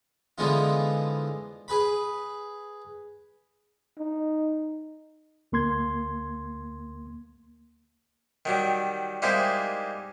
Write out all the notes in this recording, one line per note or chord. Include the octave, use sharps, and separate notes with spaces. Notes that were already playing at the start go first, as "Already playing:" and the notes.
D3 E3 F3 G#3 B3 F4
G#4 B4 B5
D#4
D2 A#3 C6 G#6
D#3 F#3 G3
G3 G#3 A#3 D#4 E4 C5